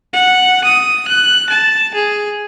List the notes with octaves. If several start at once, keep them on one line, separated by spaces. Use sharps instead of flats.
F#5
D#6
F#6
A5
G#4